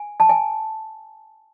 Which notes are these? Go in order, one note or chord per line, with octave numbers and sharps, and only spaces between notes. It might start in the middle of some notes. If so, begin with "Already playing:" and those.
Already playing: G#5
A5
G#5